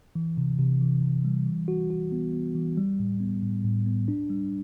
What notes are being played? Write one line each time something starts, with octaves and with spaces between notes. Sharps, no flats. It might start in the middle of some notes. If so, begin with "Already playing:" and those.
E3
C3
C3
E3
C3
G3
E3
F#4
F#4
B3
B3
E3
G3
A2
B3
A2
A2
B3
D4
G3